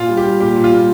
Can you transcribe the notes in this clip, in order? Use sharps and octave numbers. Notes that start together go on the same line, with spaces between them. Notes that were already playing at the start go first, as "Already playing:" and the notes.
Already playing: A#2 F4
G3
G4
G3
A#2 G4
A#2
F4
G3